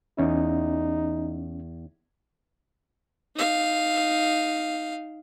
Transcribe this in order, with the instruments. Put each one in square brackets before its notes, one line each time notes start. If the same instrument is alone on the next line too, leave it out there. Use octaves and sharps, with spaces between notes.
[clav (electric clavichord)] E2 [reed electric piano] C#4 [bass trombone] D#4
[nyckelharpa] D#4 F5